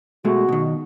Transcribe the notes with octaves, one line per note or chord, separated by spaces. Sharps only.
B2 G#3 A3 F#4
B2 D#3